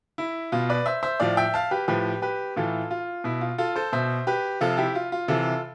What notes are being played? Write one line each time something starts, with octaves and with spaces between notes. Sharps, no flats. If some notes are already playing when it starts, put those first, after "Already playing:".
E4
B2 F4
B4 D5
C5 E5
C5 E5
A2 F3 D5 F5
E5 G5
F5 A5
G4 B4
A2 F3 G4 B4
G4 B4
A2 E3 F4 A4
F4
B2 E4
F4
F4 A4
A4 C5
B2 C5 E5
G4 B4
C3 F3 F4 A4
E4 G4
F4
F4
C3 E3 F4 A4